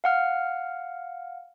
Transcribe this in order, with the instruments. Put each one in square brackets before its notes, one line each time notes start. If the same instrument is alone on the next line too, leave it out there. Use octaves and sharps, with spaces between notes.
[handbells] F5 F#5 F6